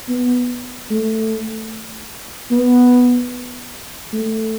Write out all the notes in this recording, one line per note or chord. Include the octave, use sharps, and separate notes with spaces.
B3
A3
B3
A3